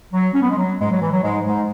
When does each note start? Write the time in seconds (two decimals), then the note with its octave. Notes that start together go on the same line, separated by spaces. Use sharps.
0.13 F#3
0.34 C#4
0.42 B3
0.50 G#3
0.58 F#3
0.80 G#2 G#3
0.91 F#3
1.02 E3
1.13 F#3
1.23 G#2 G#3
1.45 G#2 G#3